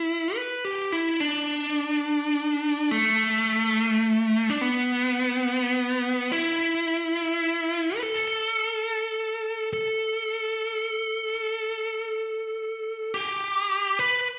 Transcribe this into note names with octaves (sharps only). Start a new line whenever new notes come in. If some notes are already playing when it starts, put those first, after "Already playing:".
Already playing: E4
B4
G4
E4
D4
A3
D4
B3
E4
B4
A4
A4
G4
B4